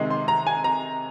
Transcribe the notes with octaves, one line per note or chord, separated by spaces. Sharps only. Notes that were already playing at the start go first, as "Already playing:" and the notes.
Already playing: C3 D#3 G#3
C6
A#5
G#5
A#5